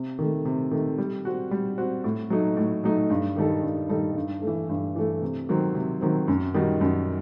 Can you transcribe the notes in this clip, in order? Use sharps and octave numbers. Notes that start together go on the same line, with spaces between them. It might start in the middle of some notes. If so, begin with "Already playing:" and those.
Already playing: C3
D#3 A3
C3
D#3 A3
G3
C4 F#4
G3
C4 F#4
A2
F#3 A3 D#4
A2
F#3 A3 D#4
G2
D#3 G3 D#4 A4
G2
D#3 G3 D#4 A4
G2
A3
E3
G2
E3 A3
C3
D#3 F#3 C4
C3
D#3 F#3 C4
F#2
D#3 G3 D#4 F#4
F#2